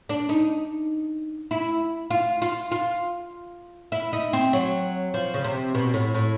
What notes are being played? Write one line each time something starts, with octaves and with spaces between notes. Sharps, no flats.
D4
D#4
E4
F4
F4
F4
E4
D#4
C4
F#3
F3
C#3
C3
B2
A2
A2